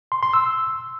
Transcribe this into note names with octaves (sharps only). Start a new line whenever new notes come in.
C6
C6
E6